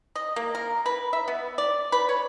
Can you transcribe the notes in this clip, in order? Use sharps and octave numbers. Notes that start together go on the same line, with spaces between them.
D#5
A#3
A#4
B4
E5
B3
D5
B4
C#5